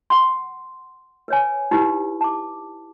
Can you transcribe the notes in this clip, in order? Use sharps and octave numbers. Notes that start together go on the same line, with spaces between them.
F#5 C6
B4 C#5 G#5
D#4 E4 G4 B4
A5 D6